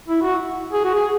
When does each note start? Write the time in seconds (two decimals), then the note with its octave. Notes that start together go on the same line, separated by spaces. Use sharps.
0.08 E4
0.22 F#4
0.73 G#4
0.84 F#4
0.95 G#4